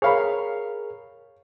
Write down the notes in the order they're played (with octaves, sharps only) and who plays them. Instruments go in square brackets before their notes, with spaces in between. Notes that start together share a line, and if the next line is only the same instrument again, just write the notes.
[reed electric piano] G#4 A#4 [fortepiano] C#5 F5 B5